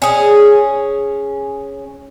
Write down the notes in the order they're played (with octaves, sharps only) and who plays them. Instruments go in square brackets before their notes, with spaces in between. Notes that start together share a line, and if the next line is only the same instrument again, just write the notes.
[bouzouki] C#4 G#4